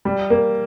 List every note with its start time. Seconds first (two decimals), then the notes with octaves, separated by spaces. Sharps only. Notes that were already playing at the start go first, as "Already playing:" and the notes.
0.05 G3
0.30 A#3